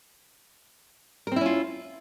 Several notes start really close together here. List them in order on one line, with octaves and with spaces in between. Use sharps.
A#4 C4 E4 C#4 F4